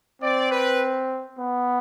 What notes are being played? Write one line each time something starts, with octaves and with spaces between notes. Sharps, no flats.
C4 D5
B4
B3